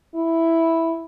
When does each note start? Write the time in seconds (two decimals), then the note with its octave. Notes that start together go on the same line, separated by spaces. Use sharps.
0.15 E4